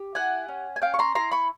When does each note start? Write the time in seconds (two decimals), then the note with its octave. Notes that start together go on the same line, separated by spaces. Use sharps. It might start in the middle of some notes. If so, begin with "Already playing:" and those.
Already playing: G4
0.15 E4 F#5 G#5
0.48 C#4
0.76 G#5
0.82 C#4 F5 G5
0.94 C#6
0.99 A#5 C6
1.15 E4 A#5 C6
1.32 B5 C#6